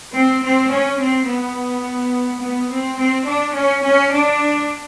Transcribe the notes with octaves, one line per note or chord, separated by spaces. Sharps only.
C4
C4
C#4
C4
B3
B3
C4
C4
D4
C#4
C#4
D4